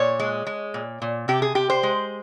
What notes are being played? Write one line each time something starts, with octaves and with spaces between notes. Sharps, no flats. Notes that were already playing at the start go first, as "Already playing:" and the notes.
Already playing: A#2 C#5
G#3
G#3
A#2
A#2
C3 G4
G#4
C3 G4
C5
G#3